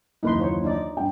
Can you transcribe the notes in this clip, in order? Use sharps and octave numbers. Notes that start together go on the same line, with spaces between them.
F#1 D#2 E3 D#4 B4 C6
F4 C5 C#5
D4 D#4 D5
G2 G5